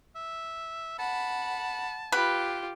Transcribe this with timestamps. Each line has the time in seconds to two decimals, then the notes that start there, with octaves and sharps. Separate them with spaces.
0.15 E5
0.99 F#5 A5 B5
2.12 F4 G4 B4